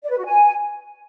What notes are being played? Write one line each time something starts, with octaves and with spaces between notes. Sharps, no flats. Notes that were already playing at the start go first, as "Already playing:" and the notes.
D5
B4
F#4
G#5